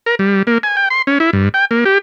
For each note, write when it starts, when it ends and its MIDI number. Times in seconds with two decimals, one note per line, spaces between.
0.06 0.15 70
0.19 0.43 55
0.47 0.58 58
0.63 0.76 80
0.77 0.89 79
0.90 1.02 84
1.07 1.18 61
1.20 1.31 64
1.33 1.49 43
1.54 1.65 79
1.71 1.84 58
1.85 1.98 67